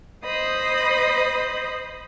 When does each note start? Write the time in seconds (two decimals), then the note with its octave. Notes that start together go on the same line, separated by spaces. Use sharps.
0.25 C5 D#5 B5 D#6